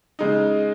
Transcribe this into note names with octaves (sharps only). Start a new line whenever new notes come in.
C#3 G#3 D#4